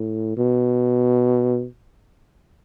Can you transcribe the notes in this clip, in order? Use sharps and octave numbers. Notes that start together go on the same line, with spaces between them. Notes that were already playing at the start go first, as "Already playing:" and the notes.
Already playing: A2
B2